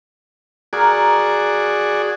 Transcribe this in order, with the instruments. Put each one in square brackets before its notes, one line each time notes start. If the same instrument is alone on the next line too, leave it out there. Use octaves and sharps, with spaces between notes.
[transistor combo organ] F#4 G#4 D5 [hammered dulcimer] A#4